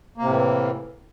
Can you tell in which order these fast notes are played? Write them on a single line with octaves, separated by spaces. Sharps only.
A#3 C3 A2 E3